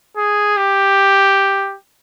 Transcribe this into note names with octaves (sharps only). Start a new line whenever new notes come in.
G#4
G4